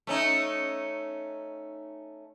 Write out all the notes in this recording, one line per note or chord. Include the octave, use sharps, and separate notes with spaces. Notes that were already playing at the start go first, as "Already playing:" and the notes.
A3 C#4 D#4